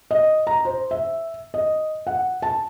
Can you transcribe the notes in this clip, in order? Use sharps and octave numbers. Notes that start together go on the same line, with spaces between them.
D#5
A#5
C5
E5
D#5
F#5
A5